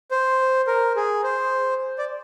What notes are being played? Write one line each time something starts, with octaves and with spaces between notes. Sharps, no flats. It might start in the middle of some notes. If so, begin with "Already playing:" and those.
C5
A#4
G#4
C5
D5